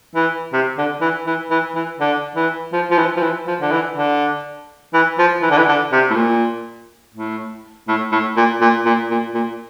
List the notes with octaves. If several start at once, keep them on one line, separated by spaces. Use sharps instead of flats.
E3
C3
D3
E3
E3
E3
E3
D3
E3
F3
F3
E3
F3
E3
F3
D3
E3
D3
E3
F3
E3
D3
E3
D3
C3
A2
A#2
A2
A2
A2
A#2
A#2
A#2
A#2
A#2